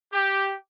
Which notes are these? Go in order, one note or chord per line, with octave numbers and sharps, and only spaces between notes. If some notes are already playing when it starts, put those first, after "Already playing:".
G4